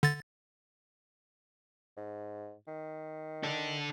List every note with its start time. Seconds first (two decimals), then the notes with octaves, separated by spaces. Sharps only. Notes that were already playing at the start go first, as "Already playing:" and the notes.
0.03 D3 A6
1.97 G#2
2.67 D#3
3.43 D4 A4